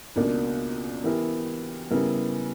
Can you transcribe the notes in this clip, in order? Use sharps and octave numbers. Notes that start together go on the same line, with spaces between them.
C#2 B2 A#3 D4
E3 B3 E4 G4 A#4
C#3 G3 B3 E4 A#4